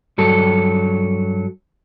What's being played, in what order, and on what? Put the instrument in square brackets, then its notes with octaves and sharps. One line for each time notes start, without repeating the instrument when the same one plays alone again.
[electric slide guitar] G2 F#3 A4